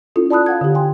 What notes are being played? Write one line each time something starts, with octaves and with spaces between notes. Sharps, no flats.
C#4 E4 F4 A4
D5 A5 B5 D#6 F#6
F5 F#5 G#6
D3 G4
G5 G#5 C6